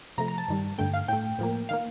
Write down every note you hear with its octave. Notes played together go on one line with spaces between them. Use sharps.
C3 F3 A3 A#5
A#5
A5
G2 D#3 G3
G2 D3 A3 G5
F5
A2 A3 G5
A2 F3 A#3
D#3 A#3 F5